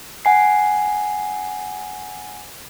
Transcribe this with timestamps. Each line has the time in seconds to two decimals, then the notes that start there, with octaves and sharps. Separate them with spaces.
0.25 F#5 G#5 C7